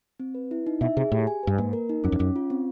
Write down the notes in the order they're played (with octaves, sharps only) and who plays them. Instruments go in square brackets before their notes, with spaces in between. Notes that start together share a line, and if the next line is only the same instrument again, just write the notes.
[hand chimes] C4
B4
E4
D#4
[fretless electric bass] B2 [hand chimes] E5
[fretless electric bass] C3 [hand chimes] G#4
[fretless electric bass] A2 [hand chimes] G4
[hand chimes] G#5
[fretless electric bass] G2 [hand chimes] B4
[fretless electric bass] G#2 [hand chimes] A#3
[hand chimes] A#4
D#4
[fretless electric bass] F#2 [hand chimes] C#4
[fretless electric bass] F2
[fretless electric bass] F#2 [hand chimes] C#4
[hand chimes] F4
C4